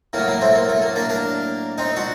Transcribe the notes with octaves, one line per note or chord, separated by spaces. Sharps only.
A2 F#3 A#3
A#3
A3 C4
A#3
A3
A#3
A#3 D4
A#3 D4
C4 D#4
D4 F#4